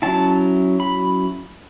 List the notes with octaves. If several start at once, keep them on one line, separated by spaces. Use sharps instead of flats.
F#3 C#4 E4 A5
B5